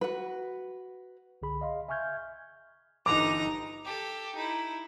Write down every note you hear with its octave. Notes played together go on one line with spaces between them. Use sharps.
F#4 B4
C2 D3 G#4 B5
D#5 F5 C6
E5 G#5 C#6 F6 G6 G#6
G1 D3 E3 D#4 A#5 D6
G4 A4
D#4 E4